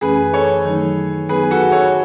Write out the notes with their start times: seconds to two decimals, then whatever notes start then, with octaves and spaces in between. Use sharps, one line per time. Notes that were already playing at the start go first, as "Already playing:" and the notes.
0.01 F#2 E3 A3 C#4 G#4 B4
0.33 A4 C#5
0.65 D#3 F#3 A3 D#4
1.29 D#3 F#3 B3 D#4 G#4 B4
1.51 F#4 A4
1.72 A4 C#5